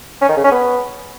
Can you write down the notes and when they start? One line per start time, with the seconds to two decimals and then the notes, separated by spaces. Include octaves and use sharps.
0.21 C#4
0.29 D#3
0.37 C#3
0.44 C#4
0.52 B3